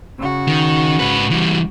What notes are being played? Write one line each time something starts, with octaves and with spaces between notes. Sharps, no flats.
C#3 F#4
D#3
G#2 B4
E3 G3